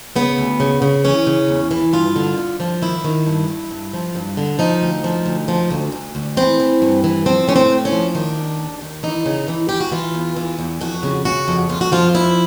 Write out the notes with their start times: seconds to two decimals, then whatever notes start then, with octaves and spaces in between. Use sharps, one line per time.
0.16 C#3 B3
0.38 D2
0.60 C#3
0.82 C#3
1.04 E3 C#4
1.27 C#3
1.49 E2
1.71 E3
1.93 G2 F4
2.16 D3
2.38 D3
2.60 F3
2.82 D#3 E4
3.04 D#3
3.26 G2
3.48 G2
3.70 G2
3.93 F3
4.15 G2
4.37 D3
4.59 F3 D#4
4.81 D2
5.04 F3
5.26 D2
5.48 F3
5.71 D2
5.92 D2
6.15 D2
6.37 E3 C4
6.60 E3
6.82 G2
7.04 E3
7.25 F3 C4
7.48 A2 C#4
7.56 C4
7.70 A2
7.85 C#4
7.92 F3
8.15 D#3 D4
8.37 D#2
8.59 D#2
8.81 D#3
9.03 E3 D#4
9.26 C#3
9.48 E3
9.69 E3 G4
9.80 F#4
9.92 E3 F4
10.15 E2
10.37 E3
10.59 E2
10.81 F2 F#4
11.03 C#3
11.25 C#3 F#4
11.48 F2
11.69 F2 F4
11.81 F#4
11.92 F3 F4
12.14 F2 E4